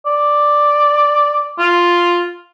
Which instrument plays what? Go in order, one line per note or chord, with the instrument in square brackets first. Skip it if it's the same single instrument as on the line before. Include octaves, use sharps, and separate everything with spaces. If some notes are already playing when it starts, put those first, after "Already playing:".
[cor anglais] D5
F4